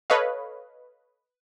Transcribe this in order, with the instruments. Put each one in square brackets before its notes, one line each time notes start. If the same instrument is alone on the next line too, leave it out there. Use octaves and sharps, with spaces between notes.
[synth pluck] A4 B4 C#5 D#5 F5